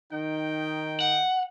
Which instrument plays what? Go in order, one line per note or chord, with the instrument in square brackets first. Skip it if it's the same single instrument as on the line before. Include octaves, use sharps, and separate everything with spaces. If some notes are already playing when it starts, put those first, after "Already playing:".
[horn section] D#3 D#4 G5
[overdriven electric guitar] F#5